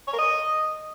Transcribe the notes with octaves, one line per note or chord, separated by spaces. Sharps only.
C#5
A#4
D#5